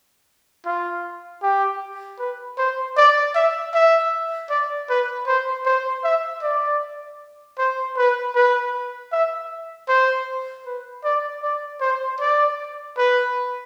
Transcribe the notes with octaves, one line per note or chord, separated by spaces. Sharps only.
F4
G4
B4
C5
D5
E5
E5
D5
B4
C5
C5
E5
D5
C5
B4
B4
E5
C5
B4
D5
D5
C5
D5
B4